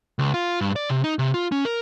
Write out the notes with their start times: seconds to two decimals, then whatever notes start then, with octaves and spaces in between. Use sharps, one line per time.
0.19 C#2
0.34 F4
0.61 G2
0.76 D5
0.89 C3
1.04 D#4
1.19 C3
1.34 F4
1.52 C#4
1.65 A#4